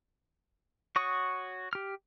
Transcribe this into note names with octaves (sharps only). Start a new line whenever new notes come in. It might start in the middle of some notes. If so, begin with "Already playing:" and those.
F#4 C#5 C#6 D#6
G4 F6